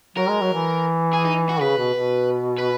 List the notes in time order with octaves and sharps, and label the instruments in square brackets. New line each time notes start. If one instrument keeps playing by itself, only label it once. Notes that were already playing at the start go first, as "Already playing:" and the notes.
[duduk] F#3 [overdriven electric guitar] A#4
[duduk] G#3
F#3
E3
[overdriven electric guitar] G#4
D#4
F#4
[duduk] C#3 [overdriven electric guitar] B4
[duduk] B2
B2
[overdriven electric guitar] B4